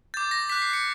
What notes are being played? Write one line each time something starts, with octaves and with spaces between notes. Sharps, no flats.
D6 G6 A6
A#6
D6 F#6 B6
C7
C#7